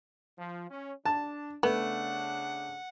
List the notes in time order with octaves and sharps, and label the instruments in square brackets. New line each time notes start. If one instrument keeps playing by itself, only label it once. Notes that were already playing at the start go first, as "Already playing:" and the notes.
[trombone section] F3
C#4
[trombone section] D4 [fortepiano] A5
[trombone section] C#3 D4 [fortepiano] A3 [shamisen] B3 [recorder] F#5